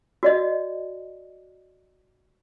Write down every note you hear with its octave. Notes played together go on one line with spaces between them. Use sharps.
F#4 D5 D#5